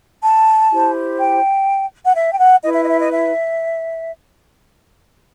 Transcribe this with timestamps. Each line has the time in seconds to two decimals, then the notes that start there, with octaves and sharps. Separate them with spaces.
0.22 A5
0.71 E4 G4 C5
1.18 G5
2.04 F#5
2.15 E5
2.31 G5
2.39 F#5
2.62 E4 B4 D#5
2.74 E5
2.82 D#5
2.87 E5
2.99 D#5
3.10 E5